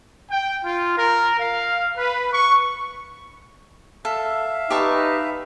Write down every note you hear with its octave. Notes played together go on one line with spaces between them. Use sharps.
G5
F4
A#4
F5
B4
C#6
A4 E5 F5
D#4 G4 B4 A5 C#6